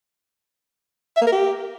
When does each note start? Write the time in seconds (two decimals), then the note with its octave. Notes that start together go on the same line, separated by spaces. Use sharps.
1.17 E5
1.22 A#3
1.27 A#4
1.32 G4